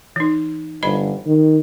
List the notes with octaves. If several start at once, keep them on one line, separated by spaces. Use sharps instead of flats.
E3 D#4
G1 C5 D#5 B5
D#3